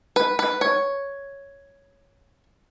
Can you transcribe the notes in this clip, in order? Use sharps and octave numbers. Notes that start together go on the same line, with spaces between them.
B4
B4
C#5